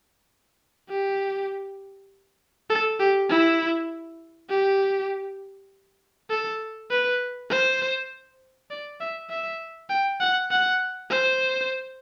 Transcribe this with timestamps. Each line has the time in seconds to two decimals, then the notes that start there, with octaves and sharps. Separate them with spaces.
0.90 G4
2.70 A4
3.00 G4
3.29 E4
4.50 G4
6.30 A4
6.91 B4
7.50 C5
8.71 D5
9.00 E5
9.30 E5
9.90 G5
10.21 F#5
10.51 F#5
11.11 C5